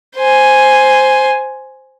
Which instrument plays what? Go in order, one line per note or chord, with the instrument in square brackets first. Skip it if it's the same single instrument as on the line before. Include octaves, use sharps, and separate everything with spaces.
[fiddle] C5 G#5